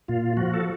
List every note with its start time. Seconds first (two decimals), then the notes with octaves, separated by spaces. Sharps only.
0.08 A#2 F4
0.37 F3 F#4
0.54 A4